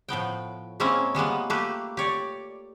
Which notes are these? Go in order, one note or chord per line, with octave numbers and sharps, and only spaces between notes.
A2 F3 B3 G5
G#3 A#3 C4 C#4 E4 F4
G3 G#3 A#3 B3
A3 A#3 G4 B4
G4 C#5 D5